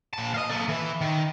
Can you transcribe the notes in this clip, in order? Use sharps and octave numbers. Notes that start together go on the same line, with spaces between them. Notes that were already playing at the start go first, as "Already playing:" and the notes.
A#2 A5
D#5 F5
A#3 A4
E3 E4
D#3